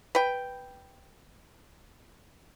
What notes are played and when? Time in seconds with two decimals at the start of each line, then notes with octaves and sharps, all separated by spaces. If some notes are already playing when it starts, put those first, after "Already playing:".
0.15 B4 G5